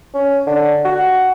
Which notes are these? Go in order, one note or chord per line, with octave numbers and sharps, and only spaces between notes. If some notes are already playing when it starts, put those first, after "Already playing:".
C#4
D3
F#4